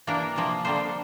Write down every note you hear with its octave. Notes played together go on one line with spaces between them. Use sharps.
E3 A#3 D4 A#4
C3 F3 A#3
D3 G3 A#3 C5